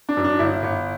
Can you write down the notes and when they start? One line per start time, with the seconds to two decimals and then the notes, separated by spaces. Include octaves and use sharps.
0.09 D4
0.17 F#2
0.24 D4
0.39 G1 E4
0.63 G1